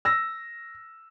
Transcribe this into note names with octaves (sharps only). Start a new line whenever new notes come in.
E6 A#6